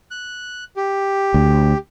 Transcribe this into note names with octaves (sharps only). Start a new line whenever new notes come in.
F#6
G4
D2